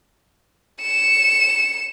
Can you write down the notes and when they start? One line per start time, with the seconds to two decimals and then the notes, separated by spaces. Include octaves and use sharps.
0.82 C#7 E7